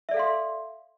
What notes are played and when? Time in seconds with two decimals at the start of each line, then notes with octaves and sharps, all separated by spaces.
0.09 E5
0.11 D5
0.14 A4
0.17 F5
0.19 C6